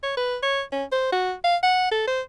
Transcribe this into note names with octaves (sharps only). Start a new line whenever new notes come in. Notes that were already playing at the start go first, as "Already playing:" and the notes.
C#5
B4
C#5
C#4
C5
F#4
F5
F#5
A4
C5